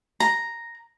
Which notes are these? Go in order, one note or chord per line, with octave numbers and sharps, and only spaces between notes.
A#5